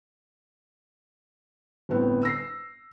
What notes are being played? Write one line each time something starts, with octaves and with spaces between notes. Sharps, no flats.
G1 A2 B3 C4
E6 A#6 C7